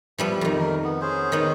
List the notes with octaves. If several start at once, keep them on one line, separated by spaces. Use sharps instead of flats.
F3 G3 B3 E5
F2 D#3
A#4
B3
C#4 G#4 C5
D#3 B3